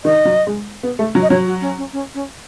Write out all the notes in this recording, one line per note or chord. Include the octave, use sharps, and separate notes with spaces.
D#3 D#5
F#3
G#3
B3
A3
F#3
D#5
F#3 C#5
F#4
C#4
C#4
C#4
C#4